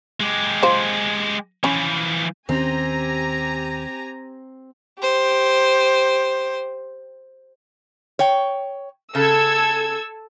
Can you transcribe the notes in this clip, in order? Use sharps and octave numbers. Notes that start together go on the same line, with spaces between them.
G#3 G4
F4 C5
E3 F3 C#4 G#5 B5
D#2 D#3 C4 C#4 G4 G#5 A#5
G4 C5
C#5 G5
C#3 A4 E6 G#6